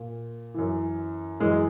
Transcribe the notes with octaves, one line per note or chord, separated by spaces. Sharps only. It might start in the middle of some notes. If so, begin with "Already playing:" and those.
Already playing: A#2
F#2 E3
F#2 E3 G#3